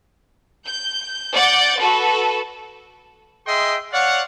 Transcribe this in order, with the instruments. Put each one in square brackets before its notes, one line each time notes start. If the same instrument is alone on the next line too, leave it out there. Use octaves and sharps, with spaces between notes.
[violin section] G6
D5 F#5 G6 A6
F#4 A4 B4
[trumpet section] G#4 D#5 E5 G5 C6
C#5 D5 F5 F#5